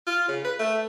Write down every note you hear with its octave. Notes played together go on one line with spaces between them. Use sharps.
F4
C#3
B4
A3